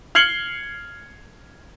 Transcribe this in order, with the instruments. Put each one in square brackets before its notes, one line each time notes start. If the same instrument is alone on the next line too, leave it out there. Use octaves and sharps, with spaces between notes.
[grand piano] F6 G#6 C7 C#7 F#7 G7